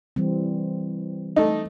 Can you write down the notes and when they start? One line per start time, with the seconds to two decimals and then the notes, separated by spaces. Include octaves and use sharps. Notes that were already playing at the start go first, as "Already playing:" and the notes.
0.16 E3 G3 C4
1.36 A3 D#4